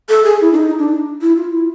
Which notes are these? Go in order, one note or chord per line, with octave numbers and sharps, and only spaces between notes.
A4
G#4
E4
D4
D#4
D4
E4
F4
E4